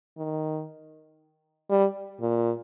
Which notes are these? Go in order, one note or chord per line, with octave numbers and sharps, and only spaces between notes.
D#3
G3
A#2